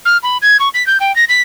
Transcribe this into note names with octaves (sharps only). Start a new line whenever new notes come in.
F6
B5
G#6
C#6
B6
G6
G5
A#6
B6